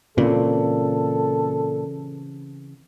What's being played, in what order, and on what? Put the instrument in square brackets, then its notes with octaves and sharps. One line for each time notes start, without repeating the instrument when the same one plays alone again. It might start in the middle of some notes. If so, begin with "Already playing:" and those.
[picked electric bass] A#2 [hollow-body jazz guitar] C#3 E3 C4 [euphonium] A4